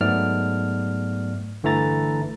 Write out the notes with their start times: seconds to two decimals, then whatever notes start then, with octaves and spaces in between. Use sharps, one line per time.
0.01 G#2 F#3 A3 B3 D5 F6
1.63 G1 D3 E3 A3 A#5 A6